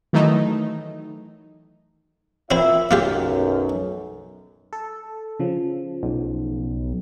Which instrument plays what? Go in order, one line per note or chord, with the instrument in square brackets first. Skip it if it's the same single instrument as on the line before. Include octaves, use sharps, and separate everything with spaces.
[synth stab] D#3 E3 F#3 A3 D#4
[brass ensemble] A#3 F4 E5 [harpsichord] C4 E4
[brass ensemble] B1 F#2 [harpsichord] A#3 F4 G4
[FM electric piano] A4
C#3 F3
[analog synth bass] B1